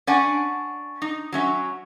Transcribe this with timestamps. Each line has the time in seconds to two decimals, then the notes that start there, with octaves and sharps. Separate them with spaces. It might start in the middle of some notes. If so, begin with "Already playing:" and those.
0.07 C#4 D4 D5 F#5 G#5
1.02 D#4
1.32 F#3 C#4 E5